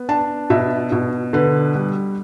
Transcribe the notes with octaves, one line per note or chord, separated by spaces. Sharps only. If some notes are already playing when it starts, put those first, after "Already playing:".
Already playing: B3
D4 A5
B2 E5
B2
D3 B4
G3